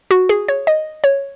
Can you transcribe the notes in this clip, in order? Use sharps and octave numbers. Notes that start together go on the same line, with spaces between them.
F#4
G#4
C#5
D#5
C#5